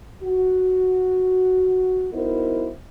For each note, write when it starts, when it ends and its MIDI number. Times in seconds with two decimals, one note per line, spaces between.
0.23 2.07 66
2.13 2.70 59
2.13 2.70 63
2.13 2.70 64
2.13 2.70 66
2.13 2.70 70
2.13 2.70 72